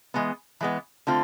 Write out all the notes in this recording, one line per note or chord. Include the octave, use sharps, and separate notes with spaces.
E3 G#3 B3
E3 G#3 B3
D3 A3 C4 F4